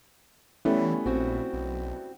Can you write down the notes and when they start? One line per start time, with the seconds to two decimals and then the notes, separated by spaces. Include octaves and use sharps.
0.65 E3 G3 A3 B3 C#4 E4
1.06 A#1 C4 F#4
1.53 B1